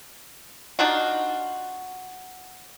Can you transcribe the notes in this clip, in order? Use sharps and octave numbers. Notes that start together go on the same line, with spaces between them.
D4 D#4 F4 F#4